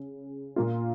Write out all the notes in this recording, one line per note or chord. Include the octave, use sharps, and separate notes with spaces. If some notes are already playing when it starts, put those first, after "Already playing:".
Already playing: C#3
A#2 A#3 F4